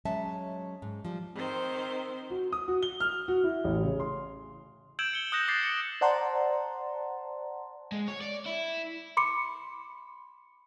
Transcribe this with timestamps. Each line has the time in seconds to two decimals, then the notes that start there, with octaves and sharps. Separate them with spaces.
0.05 F#3 G#3 C#4 E5 A5
0.82 G#2
1.05 F3 G3
1.35 D#3 C4 C5
2.30 F#4
2.52 D#6
2.68 F#4
2.83 G7
3.00 F6
3.28 F#4
3.44 E4
3.64 A1
3.83 C#3
4.00 C6
4.99 E6 G6 G#6 D7 E7 F#7
5.13 C#7 G7
5.32 D#6 F#6 G6 A#6 E7
5.48 D6 D#6 G6 A6 C7
5.63 C#7
6.01 C5 D5 F#5 A5 A#5 C6
7.92 G#3
8.08 C#5
8.21 D5
8.46 E4
9.17 B5 C6 D6 C#7